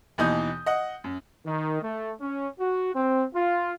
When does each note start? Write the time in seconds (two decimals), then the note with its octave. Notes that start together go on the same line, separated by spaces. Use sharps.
0.18 D#2 B2 E3 D#4 D#6 G6
0.66 D#5 F#5
1.04 F#2
1.46 D#3
1.83 A3
2.21 C#4
2.60 F#4
2.95 C4
3.34 F4